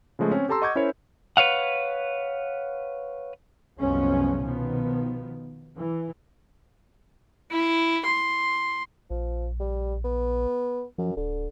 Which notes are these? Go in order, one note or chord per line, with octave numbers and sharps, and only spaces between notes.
C#3 F3 G#3 A3
C4 C#4 C#5
G4 A4 A5 A#5 C6 E6
D#5 F#5 C#6 D6 G6 G#6
C#4 E4 A#4 C5 C#5
B4 C#5 F5 F#5
C2 F#2 F3 G#3 B3 C#4
B2 D#3 F3 B3
E3
E4
C6
A#1 F3
G3
B3
F#2 F3
D1 D3